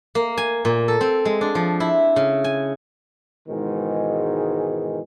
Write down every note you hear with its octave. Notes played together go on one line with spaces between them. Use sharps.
A#3
G#5
A#2
A4
C4
G#3
D4
F3
E4
C#3
G#5
G#2 B2 D#3 E3 G#3